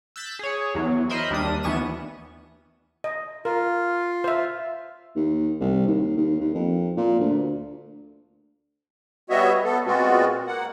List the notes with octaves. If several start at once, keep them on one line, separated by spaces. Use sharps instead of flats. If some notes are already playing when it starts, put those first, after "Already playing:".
E6 F#6 G6 A6 B6
G#4 C#5
E2 F#3
A#4 C5 D#5 E5 B5 C6
D#2 G3 D4 A#4 D#6
D#2 E3 B3 C#6 D#7 E7
D#5
F4 A#4
C5 E5
D#2
C2
D#2
D#2
D#2
F2
A#2
D2
G3 B3 F#4 C#5 D#5 E5
B3 A4
A#2 G#3 B3 C4 F4 F#4
A#3 F#5